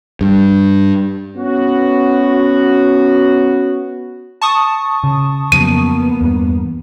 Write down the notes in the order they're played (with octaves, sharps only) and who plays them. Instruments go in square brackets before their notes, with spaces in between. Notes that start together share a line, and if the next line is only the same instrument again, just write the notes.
[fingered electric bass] G2
[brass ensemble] B3 C#4 F#4
[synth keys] A5 C#6 D#6
[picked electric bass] C#3
[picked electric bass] F2 C#3 F#3 [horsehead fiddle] A#3 B3 [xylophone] D#7
[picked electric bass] E2 G2